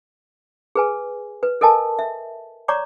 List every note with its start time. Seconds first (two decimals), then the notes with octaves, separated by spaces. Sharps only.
0.75 G#4 B4 G#5
1.43 B4
1.61 A4 A#4 D#5 G#5 A5
1.99 E5
2.68 C#5 D5 A#5 C#6 D6